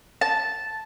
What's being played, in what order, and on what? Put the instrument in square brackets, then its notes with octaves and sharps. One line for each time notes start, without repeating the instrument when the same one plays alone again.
[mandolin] A5